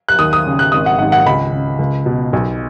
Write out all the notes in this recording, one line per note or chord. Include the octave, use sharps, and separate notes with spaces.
F#6
D#2 D#6
D#6
C#3
F#6
G#1 D#6
F#5
G#2 D#3 F#5
F#5
C#2 B5
C#3
C#2
B2
B1